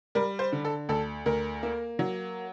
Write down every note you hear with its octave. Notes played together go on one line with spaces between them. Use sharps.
G3 A#4
C5
D3
A4
D2 A4
D2 A#4
A#3
F#3